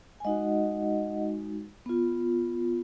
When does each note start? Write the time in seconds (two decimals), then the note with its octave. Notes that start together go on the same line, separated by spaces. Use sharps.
0.20 G#5
0.25 G#3 D#4 F#4 D#5 F#5
1.86 B3 F4